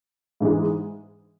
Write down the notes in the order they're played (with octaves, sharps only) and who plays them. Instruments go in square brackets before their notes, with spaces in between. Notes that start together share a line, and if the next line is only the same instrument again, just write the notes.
[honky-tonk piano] G#2 E3 G#3